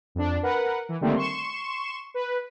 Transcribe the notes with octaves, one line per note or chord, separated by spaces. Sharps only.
F2 D4
A#4 B4 F#5
E3
D3 D#3 G3 A3 A#3 C4
C6 C#6 E7
B4